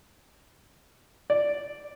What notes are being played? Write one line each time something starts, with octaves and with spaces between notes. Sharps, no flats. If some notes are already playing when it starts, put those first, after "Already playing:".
D5